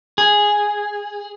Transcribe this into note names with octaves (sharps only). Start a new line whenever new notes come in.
G#4